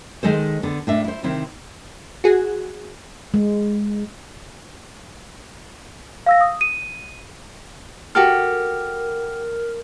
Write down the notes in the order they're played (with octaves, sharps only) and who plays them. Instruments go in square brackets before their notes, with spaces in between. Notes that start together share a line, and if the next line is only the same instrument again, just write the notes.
[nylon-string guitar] D#3 G#3 A4 C5
D3 B3
A2 D4 E5
E4 C5
C3 D#3 C4 E4
[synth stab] F#4 G#4
[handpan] G#3
[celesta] F5 E6 A#6
D#6
D#7
[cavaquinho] F#4 G4 A4 [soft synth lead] A#4 [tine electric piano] F6